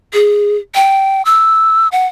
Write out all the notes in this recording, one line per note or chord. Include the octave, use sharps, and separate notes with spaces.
G#4
G5
E6
F#5